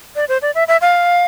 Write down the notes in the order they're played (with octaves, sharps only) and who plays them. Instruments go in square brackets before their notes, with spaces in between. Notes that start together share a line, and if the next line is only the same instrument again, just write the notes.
[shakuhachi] D5
C5
D5
E5
E5
F5